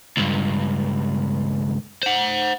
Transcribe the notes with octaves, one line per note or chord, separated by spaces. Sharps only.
C#2 G2
C5 F#5